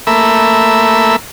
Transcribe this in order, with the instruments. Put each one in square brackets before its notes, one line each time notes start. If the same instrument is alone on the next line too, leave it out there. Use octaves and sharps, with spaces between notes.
[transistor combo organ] A3 A#3 E5 B5